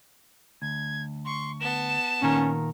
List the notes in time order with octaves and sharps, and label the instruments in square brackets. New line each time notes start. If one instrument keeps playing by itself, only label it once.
[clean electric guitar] D2 [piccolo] G#6
[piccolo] C6 [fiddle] C#6
[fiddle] B3 A5 [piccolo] E7
[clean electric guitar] A#2 D#3 A#4 [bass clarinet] C#4